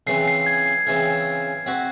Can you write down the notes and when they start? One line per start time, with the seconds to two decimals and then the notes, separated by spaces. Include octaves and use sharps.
0.07 C#3 E3 C4 C7
0.27 C7
0.46 G#6
0.66 C7
0.87 C#3 E3 C4
1.66 C4 F#4 C5 E5